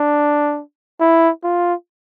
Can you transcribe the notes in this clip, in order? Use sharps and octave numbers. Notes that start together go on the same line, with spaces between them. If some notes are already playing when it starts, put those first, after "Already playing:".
Already playing: D4
E4
F4